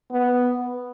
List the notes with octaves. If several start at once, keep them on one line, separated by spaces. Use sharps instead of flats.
B3